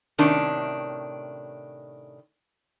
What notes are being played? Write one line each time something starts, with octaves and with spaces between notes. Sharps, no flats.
A2 C3 D#3 C#4 D4